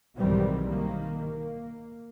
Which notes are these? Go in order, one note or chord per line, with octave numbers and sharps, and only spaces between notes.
B1 G#2 D#3 E3 G3 C4
D#3 A#3
A#3